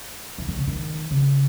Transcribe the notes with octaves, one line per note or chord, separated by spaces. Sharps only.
E3
D#3
C#3
D#3
C#3